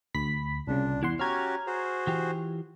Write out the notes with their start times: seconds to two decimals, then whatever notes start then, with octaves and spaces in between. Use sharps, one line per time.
0.15 D2 B5 B6
0.68 C2 A#2 C#3 D4
1.03 E2 E4 F#5 C6
1.19 C#4 F#4 G4 C#5 A#5 F6 G#6
1.67 F#4 G#4 C5
2.07 E3 F4 G4